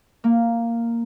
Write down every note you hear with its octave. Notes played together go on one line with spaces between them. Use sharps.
A#3